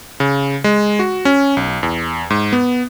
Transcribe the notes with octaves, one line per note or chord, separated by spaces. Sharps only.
C#3
G#3
F#4
C#4
B1
E2
G#2
B3